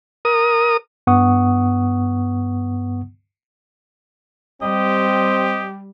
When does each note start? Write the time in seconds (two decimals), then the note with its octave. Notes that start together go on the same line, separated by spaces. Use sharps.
0.25 A#4 D#6
1.07 G2 B3 F#5 C#6 D#6
4.62 G3 C4 G4 D#5